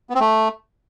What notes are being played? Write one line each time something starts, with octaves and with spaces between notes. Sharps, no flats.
B3
C4
A3